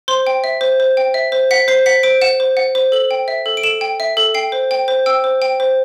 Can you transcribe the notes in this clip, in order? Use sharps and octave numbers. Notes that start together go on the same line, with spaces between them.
C5 C6
G5
E5
C5
C5
G5
E5
C5
F#5 B6
C5 C7
F#5 B6
C5 D7
F#5 E7
C5
F#5
C5
A4 F#7
G5
E5
A4
D7
A4 E7
G5
E5
A4
G5 C7
C5
G5
C5
G5 E6
C5
G5
C5